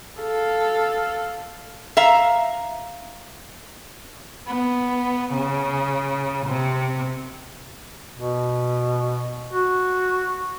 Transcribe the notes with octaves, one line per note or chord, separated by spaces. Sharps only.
A4 F5
E5 F5 A#5
B3
C#3
C3
B2
F#4